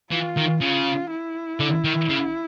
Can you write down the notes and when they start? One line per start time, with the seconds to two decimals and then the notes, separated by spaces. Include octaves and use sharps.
0.11 E3 F4
0.37 D#3
0.61 C#3 F4
1.11 E4
1.60 D3
1.84 D#3
2.10 C#3